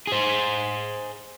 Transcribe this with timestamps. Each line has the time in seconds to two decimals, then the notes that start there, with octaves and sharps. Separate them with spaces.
0.07 G#4 C5